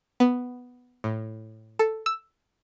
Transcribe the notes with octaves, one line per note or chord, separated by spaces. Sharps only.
B3
A2
A4
E6